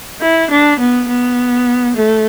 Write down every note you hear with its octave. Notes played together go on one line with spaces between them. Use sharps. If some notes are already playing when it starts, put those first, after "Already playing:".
E4
D4
B3
B3
A3